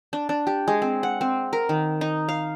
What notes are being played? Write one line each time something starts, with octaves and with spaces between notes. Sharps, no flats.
D4
D4
G4
G#3
C4
F#5
C4
A#4
D#3
D#4
F5